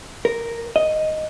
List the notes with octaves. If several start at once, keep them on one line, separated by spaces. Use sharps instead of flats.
A#4
D#5